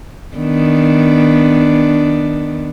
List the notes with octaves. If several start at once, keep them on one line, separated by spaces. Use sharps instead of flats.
D#3 B3 D4